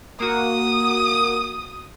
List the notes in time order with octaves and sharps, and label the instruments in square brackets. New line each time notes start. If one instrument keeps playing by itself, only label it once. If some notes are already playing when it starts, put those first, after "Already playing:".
[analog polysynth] A#3 F#4 [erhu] D#6